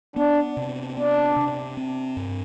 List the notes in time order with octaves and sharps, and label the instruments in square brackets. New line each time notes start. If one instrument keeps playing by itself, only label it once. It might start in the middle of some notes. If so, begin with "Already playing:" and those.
[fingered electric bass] B3 [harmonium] D4
[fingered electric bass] C3
[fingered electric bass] B3 [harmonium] D4
[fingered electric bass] C3
C4
G2